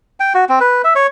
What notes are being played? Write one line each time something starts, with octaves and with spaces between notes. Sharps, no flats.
G5
F#4
C4
B4
E5
C#5